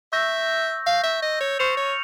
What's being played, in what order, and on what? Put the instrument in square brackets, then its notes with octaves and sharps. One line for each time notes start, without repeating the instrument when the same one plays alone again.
[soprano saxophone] E5 [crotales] C#6 E6 G6 A#6
[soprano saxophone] F5
E5
D#5
C#5
[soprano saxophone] C5 [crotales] C#6 F6 A6 C#7 F7
[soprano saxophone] C#5